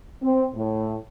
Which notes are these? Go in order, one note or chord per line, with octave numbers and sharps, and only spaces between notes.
C4
A2